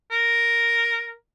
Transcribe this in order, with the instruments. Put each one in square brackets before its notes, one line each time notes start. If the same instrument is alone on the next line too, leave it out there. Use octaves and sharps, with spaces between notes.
[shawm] A#4